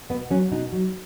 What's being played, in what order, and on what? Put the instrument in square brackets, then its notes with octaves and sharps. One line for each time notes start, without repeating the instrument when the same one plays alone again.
[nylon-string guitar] B2 B3
F#3 C#4
B2 D#4
F#3